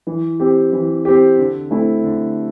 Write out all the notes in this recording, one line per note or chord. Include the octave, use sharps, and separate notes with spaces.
E3
C4 G4
E3
C4 G4
D3
A3 C4 E4
D3